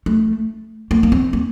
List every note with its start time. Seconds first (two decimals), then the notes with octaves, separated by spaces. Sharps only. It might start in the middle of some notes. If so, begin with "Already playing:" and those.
0.06 A3
0.91 A#3
1.03 A#3
1.12 C4
1.33 A#3